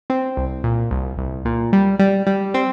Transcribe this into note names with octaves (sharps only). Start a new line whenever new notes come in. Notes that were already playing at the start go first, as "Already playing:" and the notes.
C4
C2
A#2
C2
C2
A#2
G3
G3
G3
C4